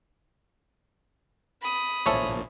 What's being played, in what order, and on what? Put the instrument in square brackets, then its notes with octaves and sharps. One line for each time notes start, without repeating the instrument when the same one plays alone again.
[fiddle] B5 D#6
[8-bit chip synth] A#1 A#2 [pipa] A4 C#5 [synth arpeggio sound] C5 E5 G#5